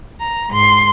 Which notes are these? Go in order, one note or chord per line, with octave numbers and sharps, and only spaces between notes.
A#5
G#2 C6